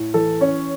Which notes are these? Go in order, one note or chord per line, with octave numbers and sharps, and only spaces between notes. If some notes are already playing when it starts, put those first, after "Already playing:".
Already playing: A2
E3 A4
C#4 C#5